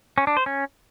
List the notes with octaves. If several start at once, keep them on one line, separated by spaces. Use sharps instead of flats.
C#4
D4
C5
C#4